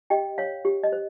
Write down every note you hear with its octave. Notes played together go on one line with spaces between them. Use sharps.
G4 D#5 G5
C#5 F5
G4
D#5
C5